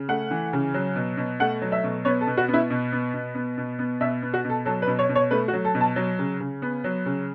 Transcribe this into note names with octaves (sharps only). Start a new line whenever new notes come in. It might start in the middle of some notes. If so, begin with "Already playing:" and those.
Already playing: C#3
A3 F#5
E3
C#3
F#3
B2
B2
A3 F#5
F#3
E5
B2
B3 C#5
A4
B2
F#4
B3
E4
B2
B3
B2
B3
B2
B3
B2 E5
B3
F#4
B2 A4
F#3 A4
B4
B2
C#5
B2
C#5
A3 B4
F#4
F#3
A4
B2
A5
F#3
C#3
C#3
B3
F#3
C#3